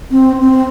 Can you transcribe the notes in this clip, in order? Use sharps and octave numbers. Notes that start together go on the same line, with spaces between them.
C4
C4